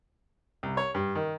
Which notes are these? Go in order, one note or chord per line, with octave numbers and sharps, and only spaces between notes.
C2
C#5
G2
D#3